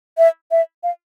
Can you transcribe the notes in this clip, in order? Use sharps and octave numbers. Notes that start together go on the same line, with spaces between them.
E5
E5
F5